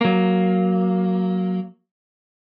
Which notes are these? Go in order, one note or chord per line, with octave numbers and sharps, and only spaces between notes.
F#3 A#3